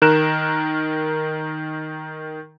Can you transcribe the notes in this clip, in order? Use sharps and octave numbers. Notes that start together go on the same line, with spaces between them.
D#3 A#4 F#6 E7